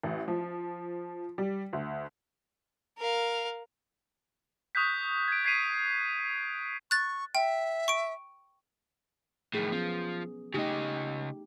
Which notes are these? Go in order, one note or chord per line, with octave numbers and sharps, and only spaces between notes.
A1
F3
G3
D2
A#4 F5
C#6 D#6 F#6 G6 B6
G#6 D7
G#6 B6 C7 D#7 F7
C#6 F#6 A6
E5 G5
C#6 D7
A2 D#3 F3 F#3 G#4
F3 B3 C#4
C#3 A3 D#4 G4 D#5